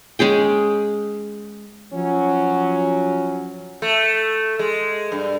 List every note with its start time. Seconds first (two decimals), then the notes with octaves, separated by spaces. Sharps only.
0.19 G#3 C#4 G#4 G5
1.93 F3 F#3 C#4
3.82 A3
4.59 G#3
5.12 G2